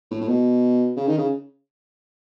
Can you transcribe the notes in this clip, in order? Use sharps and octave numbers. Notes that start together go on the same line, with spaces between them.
A2
A2
B2
C#3
D#3
C#3